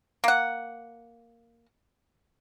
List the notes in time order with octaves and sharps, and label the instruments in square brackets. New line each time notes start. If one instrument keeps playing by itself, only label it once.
[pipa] A#3 F#5